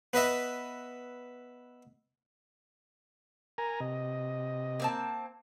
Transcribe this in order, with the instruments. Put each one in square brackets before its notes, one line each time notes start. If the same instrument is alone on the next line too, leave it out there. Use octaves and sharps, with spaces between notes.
[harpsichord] B3 B4 D#5 E5
[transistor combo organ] A#4 G#5 A#5
C3 D#5
[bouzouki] A#3 C4 A5